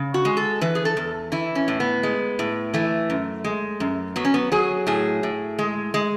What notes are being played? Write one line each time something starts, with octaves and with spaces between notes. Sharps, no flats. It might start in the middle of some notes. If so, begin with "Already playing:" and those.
Already playing: C#3
F#4
G#3
A4
E3 B4
G#4
A4
E2
E3 E4
C#4
A2
B3
G#3
A2
E3 A3
F#2
G#3
F#2
F#3 B3
C#4
B3
F#3 G#4
A2 G#4
A2
G#3
G#3